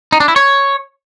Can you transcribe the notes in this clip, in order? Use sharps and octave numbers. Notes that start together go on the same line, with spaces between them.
D#4
D4
E4
C#5